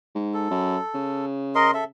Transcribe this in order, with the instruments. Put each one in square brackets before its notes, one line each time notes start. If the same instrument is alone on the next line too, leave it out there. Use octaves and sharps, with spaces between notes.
[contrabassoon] G#2
[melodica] A4
[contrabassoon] F#2
C#3
[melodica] A#4 D#5 C6
A4 E5